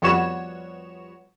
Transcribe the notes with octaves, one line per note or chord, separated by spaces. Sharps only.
F2 G3 B3 F#4 C#5 E7